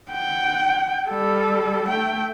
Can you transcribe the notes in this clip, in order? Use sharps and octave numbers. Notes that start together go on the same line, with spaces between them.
F#5 G5
G3 A4
A3 G5